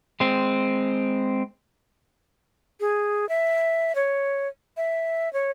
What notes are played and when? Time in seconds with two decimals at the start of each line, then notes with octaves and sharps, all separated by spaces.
0.20 G#3 C4
2.80 G#4
3.29 E5
3.95 C#5
4.77 E5
5.33 C#5